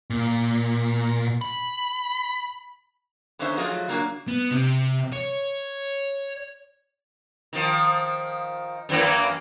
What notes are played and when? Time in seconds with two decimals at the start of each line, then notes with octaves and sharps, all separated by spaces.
0.10 A#2
1.41 B5
3.39 D3 B3 C#4 D#4 C5 E5
3.57 F3 F#3 A3 F4 G#4 D#5
3.88 C#3 F#3 A#3 D4
4.28 B3
4.51 C3
5.12 C#5
7.53 D#3 F3
8.89 F#2 E3 A#3